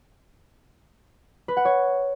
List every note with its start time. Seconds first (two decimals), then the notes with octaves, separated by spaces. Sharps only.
1.48 B4
1.57 F#5
1.65 C#5